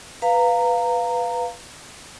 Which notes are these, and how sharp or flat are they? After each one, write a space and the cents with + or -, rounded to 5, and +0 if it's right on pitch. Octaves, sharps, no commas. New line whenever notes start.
B4 +0 F5 +0 A#5 -15